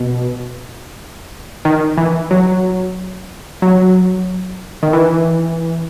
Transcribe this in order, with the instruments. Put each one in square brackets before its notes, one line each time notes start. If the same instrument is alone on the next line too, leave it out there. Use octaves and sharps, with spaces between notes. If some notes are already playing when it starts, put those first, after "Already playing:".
Already playing: [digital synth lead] B2
D#3
E3
F#3
F#3
D#3
E3